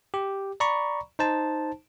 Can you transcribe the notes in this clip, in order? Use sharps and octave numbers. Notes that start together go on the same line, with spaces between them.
G4
D5 A#5 B5 C#6
D#4 C5 A5